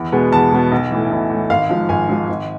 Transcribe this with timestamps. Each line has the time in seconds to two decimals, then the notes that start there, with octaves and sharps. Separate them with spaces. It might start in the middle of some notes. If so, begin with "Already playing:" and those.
Already playing: E2
0.12 B2 G#3 B3
0.32 E2 A5
0.52 B2 G#3 B3
0.72 B1
0.91 A2 E3
1.11 B1
1.30 A2 E3
1.50 G#1 F5
1.69 G#2 F3
1.89 G#1 G#5
2.09 G#2 F3
2.29 G#1